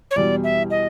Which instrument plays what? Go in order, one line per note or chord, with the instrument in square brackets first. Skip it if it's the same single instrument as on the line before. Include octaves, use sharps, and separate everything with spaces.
[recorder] C#5
[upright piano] E2 B2 G3 [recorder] D5
[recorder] E5
D#5